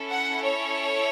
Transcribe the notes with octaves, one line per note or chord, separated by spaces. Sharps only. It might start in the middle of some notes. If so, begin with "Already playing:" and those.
Already playing: C#4 E4 A4
F#5
C#5